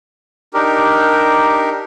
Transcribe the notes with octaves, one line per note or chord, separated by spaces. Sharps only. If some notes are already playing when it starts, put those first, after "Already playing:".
D4 D#4 G4 A#4